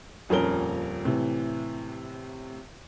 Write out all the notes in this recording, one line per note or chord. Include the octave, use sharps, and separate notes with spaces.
D#1 F2 C#4 A#4 G7
A2 C3 E3